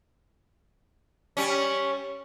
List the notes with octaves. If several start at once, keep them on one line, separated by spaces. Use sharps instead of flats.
G3 C#4